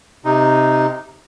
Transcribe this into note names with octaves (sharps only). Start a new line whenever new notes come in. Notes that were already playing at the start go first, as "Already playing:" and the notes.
C3 D#4